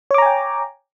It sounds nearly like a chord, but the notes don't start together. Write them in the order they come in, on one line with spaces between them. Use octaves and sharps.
C#5 D6 A#5 G#5 G5